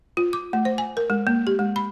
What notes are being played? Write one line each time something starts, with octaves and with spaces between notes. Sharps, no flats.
F4
D6
A3
C5
G#5
A#4
G#3
A#3
G4
G#3
B5